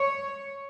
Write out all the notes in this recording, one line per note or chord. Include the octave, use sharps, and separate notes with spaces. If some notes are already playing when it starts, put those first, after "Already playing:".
Already playing: C#5